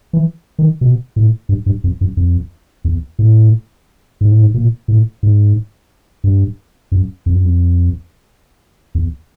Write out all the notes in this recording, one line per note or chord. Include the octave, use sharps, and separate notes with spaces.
E3
D#3
B2
A2
G2
G2
F2
F#2
F2
E2
A2
G#2
A2
G#2
A#2
A2
G#2
G2
F#2
F2
F#2
F2
E2